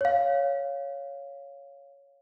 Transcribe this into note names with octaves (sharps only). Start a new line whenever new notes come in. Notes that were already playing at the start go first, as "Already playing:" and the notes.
C#5 F5